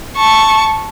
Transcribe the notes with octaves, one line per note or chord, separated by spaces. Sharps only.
A5 C#6